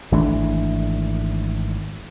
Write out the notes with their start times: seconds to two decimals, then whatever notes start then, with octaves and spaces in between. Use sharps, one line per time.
0.12 G#1 E3 A3 D4